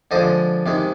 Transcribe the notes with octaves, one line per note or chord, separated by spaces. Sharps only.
D3 F3 G#3 C5 D#5
C3 D#3 G#3